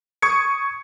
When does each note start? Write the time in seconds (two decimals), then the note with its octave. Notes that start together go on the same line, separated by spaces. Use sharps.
0.22 C#6 D#6 G#6 C#7